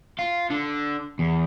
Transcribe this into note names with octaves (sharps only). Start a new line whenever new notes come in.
F4
D3
E2